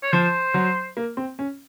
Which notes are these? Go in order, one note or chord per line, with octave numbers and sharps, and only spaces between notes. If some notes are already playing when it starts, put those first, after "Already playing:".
C#5
F3 C5
F#3
A#3
C4
C#4